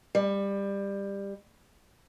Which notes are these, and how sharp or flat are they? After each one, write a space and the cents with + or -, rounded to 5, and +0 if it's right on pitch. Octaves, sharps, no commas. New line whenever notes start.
G3 +20